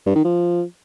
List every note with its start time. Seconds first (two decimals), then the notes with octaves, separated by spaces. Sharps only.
0.06 G2
0.15 D#3
0.24 F3